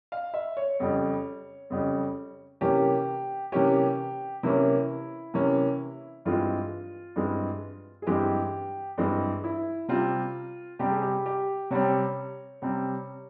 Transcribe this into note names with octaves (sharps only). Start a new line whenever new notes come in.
F5
E5
C#5
F2 C#3 G3
F2 C#3 G3
C3 E3 A#3 C#4 G4
C3 E3 A#3 C#4 G4
C3 E3 A#3 C#4 E4
C3 E3 A#3 C#4
G2 E3 G#3 C4 F4
G2 E3 G#3 C4
G#4
G2 E3 G#3 C4 G4
G2 E3 G#3 C4
E4
C3 G3 C4 F4
C3 G3 C4 G4
G#4
G4
G4
C3 G3 C4 C#5
C3 G3 C4